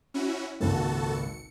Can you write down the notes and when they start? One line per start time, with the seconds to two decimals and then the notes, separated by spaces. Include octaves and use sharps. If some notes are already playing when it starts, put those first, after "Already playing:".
0.14 C#4 E4 F#4
0.61 G#1 C#2 A#2 F#4 A4 A5
1.13 C#7